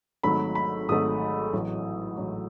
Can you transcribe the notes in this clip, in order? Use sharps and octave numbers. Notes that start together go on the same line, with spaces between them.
G#1 G#2 F#3 A3 B5
B5
G#1 G#2 F#3 A3 D#6
A1 A2 F#3
A1 A2 F#3